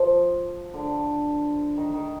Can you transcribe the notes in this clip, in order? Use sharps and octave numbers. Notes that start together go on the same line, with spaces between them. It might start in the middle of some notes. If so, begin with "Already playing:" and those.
Already playing: F3
D3
D#3
D#3